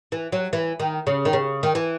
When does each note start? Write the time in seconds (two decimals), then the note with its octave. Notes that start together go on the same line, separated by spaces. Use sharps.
0.12 E3
0.32 F#3
0.53 E3
0.80 D#3
1.07 C#3
1.25 D#3
1.33 C#3
1.63 D#3
1.75 E3